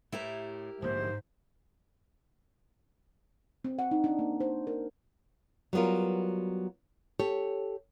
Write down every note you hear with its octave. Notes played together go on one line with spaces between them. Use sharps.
A2 E4 G4 A#4
D1 A#1 G#2 A#3 C5
C4
F#5
D#4
D4
A#3
C5
A#4
F#3 G3 B3 F4 A#4
G4 A4 C#5